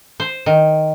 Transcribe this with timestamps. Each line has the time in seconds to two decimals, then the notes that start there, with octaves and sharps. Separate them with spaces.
0.20 C5
0.46 D#3